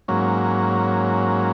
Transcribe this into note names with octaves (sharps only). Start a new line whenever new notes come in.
G#2 F#3 A#3 C#4